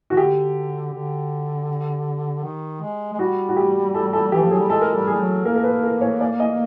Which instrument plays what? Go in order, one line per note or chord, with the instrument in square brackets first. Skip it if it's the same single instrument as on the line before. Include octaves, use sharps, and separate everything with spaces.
[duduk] D#3 [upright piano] F#4
[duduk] D3 [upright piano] G4
[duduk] D3
D#3
G#3
G#3
[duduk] G3 [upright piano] F#4
[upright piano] F#4
G4
A4
A4
[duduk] E3 [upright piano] G4
[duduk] F3
[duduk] F#3 [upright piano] G#4
[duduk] G3
[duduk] G#3 [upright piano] A4
[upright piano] A#4
[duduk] G3 [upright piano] A4
[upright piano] G#4
[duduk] G3
F#3
[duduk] A#3 [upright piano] A#4
[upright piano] A#4
B4
A#4
C#5
D5
D#5